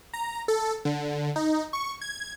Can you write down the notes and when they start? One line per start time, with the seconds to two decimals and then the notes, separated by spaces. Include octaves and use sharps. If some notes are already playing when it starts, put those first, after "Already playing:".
0.13 A#5
0.48 A4
0.85 D3
1.36 D#4
1.73 C#6
2.01 G#6